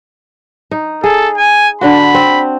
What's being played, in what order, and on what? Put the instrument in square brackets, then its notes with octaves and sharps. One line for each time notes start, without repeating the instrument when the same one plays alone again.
[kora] D#4
[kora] G#4 [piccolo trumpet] A4
[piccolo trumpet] G#5
[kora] D3 D4 F#4 [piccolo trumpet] B5
[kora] C4